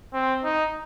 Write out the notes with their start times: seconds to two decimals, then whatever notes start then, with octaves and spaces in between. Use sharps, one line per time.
0.13 C4
0.44 D#4